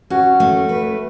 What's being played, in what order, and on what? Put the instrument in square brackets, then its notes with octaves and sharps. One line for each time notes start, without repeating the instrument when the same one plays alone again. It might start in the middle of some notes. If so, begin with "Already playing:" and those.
[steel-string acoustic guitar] C#4 [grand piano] F#4
[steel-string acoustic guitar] A3
B4